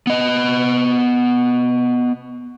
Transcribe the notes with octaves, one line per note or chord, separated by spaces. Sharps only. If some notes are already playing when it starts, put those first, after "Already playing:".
B3 D#5